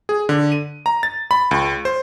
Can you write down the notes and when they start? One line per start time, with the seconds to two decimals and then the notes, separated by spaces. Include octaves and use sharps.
0.09 G#4
0.29 D3
0.52 D#7
0.86 A#5
1.03 A6
1.31 B5
1.51 C#2
1.85 C5